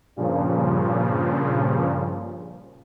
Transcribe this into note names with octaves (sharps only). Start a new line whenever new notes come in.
G2 A#2 C#3 F3